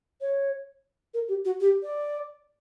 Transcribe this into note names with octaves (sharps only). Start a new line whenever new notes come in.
C#5
A#4
G4
F#4
G4
D5